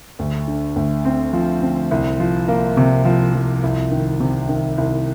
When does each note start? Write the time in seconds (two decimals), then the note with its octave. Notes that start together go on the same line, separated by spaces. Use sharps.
0.19 D2
0.47 D3
0.76 D2
1.05 C4
1.33 F3
1.62 C4
1.91 C2
2.20 F3
2.48 A#3
2.77 C3
3.05 F3
3.34 F3
3.63 C2
3.91 D#3
4.20 C3
4.49 D#3
4.78 C2